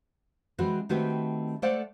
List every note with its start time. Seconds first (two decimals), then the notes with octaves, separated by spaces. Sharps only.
0.58 E3 G#3 C4 F#4 G#4 B4
0.89 D#3 A3 C4 F#4 G4 B4
1.62 A3 A4 C5 D5 F5 F#5